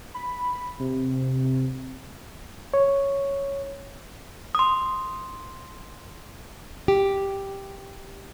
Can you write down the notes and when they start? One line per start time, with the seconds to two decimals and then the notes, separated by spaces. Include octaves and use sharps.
0.14 B5
0.80 C3
2.74 C#5
4.55 C6 D#6
6.88 G4